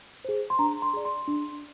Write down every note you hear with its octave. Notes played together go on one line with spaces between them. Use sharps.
G#4 C5
C6
D4 A#5
C6
G#4 D5
C6
D4